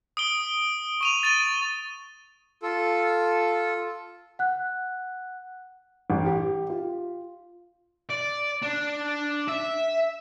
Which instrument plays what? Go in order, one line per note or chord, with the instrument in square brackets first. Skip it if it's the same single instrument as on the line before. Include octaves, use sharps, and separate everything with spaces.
[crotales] D#6 D7 G7
C#6 D#7 F7
A6 D#7 G7
[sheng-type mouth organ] F4 A4
[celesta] F#5 F#6
[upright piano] A1
G4
F4
[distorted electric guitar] D5
D4
E5